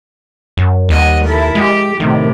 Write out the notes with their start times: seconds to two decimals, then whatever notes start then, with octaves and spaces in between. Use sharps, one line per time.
0.57 F#2
0.89 D#2 G3 D#5 F#5
1.24 E4 A4 A#4
1.55 G#3 G4
2.00 A2 C3 D#3